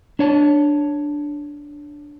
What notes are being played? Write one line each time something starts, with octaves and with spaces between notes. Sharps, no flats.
D4 C#5 A5